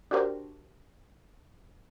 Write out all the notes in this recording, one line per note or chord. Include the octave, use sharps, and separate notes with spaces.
D4 F#4 G4 A#4 C5